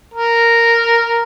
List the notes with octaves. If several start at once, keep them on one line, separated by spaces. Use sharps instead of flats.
A#4